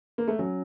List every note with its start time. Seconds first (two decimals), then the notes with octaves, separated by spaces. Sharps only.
0.18 A#3
0.28 A3
0.39 F#3 C#4